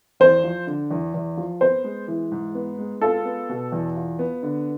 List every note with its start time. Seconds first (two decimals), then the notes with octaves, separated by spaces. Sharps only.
0.20 E2 C5
0.44 F3
0.67 D3
0.91 E2
1.14 E2
1.37 F3
1.60 B3 C5
1.84 G#3
2.08 E3
2.32 G#2
2.55 B3
2.79 G#3
3.01 F4 A4
3.25 B3
3.49 B2
3.72 E2
3.96 F4
4.19 B3
4.43 D3